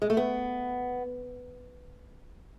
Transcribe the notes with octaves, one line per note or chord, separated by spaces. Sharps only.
G#3
A3
B3